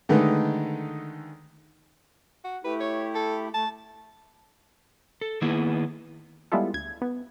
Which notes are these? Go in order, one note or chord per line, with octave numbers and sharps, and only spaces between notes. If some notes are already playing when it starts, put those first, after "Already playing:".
D3 D#3 G#3 A3 D#4 B4
F#4
A3 E4 G4 B4
C#5
A4
A3 A5
A4
D#3 A#3 B3 E4 G#4
G3 G#3 B3 E4 F4 A4
D2 G#6
B3